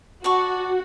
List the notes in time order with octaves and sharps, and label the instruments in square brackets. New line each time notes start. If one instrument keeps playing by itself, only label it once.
[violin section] F#4 [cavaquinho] D5 A5 C#6